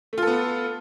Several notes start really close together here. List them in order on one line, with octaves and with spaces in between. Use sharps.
A3 F4 A4 B3